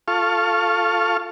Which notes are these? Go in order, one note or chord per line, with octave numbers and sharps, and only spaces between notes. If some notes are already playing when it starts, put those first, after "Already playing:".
F4 A4 F5 C#6